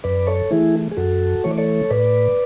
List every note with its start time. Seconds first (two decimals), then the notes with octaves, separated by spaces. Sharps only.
0.04 F#2 B4 D5
0.27 A4 C#5
0.51 E3 A3 E4 G#4
0.91 G#4
0.97 F#2 F#4 A4
1.44 E3 A3 C#5
1.51 D5
1.58 A4 C#5
1.90 A2 B4 D5